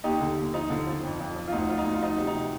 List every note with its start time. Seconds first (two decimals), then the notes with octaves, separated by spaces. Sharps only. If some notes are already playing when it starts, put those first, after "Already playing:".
0.04 D#2 D#4 G4
0.21 D3
0.38 D#2
0.54 F3 D#4
0.70 D3
0.87 F3
1.03 F2
1.20 F2
1.36 F3
1.48 F4
1.52 D2 D#4
1.69 F3 F4
1.78 D#4
1.85 D2
1.94 F4
2.02 F3 D#4
2.19 C3
2.27 D#4
2.35 C3